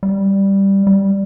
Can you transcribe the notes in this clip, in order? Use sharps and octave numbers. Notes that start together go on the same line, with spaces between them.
G3
G3